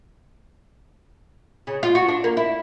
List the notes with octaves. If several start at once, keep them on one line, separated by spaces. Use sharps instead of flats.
C#3
F4
F#4
D4
A#3
E4